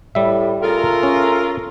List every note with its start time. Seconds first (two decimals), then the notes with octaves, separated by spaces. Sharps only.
0.15 A2 G3 E5
0.62 C#3 A3 F4 A4 A#4 A#5
1.03 C#4